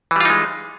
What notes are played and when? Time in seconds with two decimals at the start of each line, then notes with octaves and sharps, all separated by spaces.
0.11 E3
0.16 G3
0.21 F4
0.25 D#4
0.30 G#3